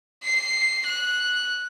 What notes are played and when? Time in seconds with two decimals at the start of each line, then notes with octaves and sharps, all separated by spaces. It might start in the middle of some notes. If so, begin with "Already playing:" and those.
0.24 C7
0.86 F#6